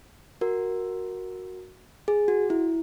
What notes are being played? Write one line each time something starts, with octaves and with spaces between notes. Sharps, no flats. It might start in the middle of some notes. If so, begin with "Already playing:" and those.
F#4 A#4
G#4
F#4
E4